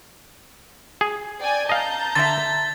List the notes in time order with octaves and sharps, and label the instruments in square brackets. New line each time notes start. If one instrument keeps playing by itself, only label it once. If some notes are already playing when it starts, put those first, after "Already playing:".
[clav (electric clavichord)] G#4
[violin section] D5 G5 G#5
[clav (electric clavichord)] D#5 F5 [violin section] A5 A#5 G6
[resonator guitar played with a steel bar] D3 E5 [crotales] A6